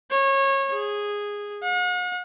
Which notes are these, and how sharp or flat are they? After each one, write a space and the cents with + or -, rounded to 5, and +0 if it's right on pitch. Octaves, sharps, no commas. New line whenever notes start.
C#5 -25
G#4 -10
F#5 -45